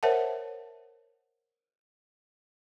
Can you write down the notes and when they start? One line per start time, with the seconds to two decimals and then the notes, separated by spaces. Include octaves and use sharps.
0.03 A#4 C5 C#5 E5 F#5 A5